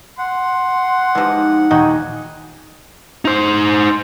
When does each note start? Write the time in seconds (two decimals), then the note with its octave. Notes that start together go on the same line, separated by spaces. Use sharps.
0.19 F#5 C6
1.15 E3 F3 G#3 D#4 G4
1.71 D#1 D#4 F#4 G5 G#5 D#6
3.25 D#4 C5